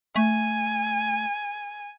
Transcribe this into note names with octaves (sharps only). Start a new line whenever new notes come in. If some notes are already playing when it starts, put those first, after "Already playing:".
A3 G#5